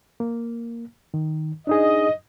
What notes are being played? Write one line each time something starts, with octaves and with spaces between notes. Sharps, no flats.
A#3
D#3
D4 D#4 G#4 D#5